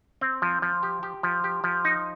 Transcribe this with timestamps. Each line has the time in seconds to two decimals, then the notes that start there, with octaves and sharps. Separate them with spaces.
0.21 C4
0.42 F3
0.62 F3
0.83 G4
1.03 G4
1.23 F3
1.44 G4
1.64 F3
1.85 D#4